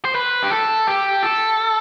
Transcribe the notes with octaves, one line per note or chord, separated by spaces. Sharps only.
C5
B4
G4
A4
G4
A4